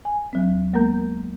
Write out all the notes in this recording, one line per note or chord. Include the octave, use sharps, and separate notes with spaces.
G#5
D#2 F#3 C4
G#3 A#3 B3 A#4 A#5 G6